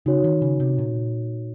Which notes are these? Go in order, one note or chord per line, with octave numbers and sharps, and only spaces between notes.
C#3 D#4 F#4 C#5
D#3
C#3
C3
A#2